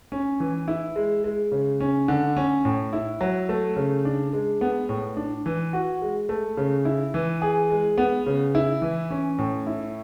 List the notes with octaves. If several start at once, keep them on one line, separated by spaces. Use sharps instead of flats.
C#4
E3
E4
G#3
G#3
C#3
C#4
D3
C#4
A2
E4
F#3
A3
C#3
D4
G#3
B3
A2
D4
E3
F#4
G#3
A3
C#3
E4
E3
G#4
G#3
B3
C#3
E4
E3
C#4
A2
E4